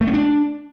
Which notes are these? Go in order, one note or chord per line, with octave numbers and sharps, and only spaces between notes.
A3
C#4
D4